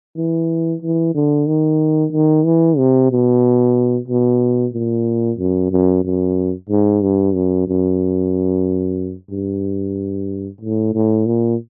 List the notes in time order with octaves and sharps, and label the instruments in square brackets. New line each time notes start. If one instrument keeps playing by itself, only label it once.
[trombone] E3
E3
D3
D#3
D#3
E3
C3
B2
B2
A#2
F#2
F#2
F#2
G#2
G2
F#2
F#2
G2
A2
A2
A#2